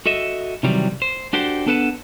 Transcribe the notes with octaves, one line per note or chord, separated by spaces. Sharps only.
F#4 A4 D#5 E5
C3 D#3 E3 F#3 G3
C5
D4 F#4 G4 A4 C5
B3 D4 A4 B4 F#5 A5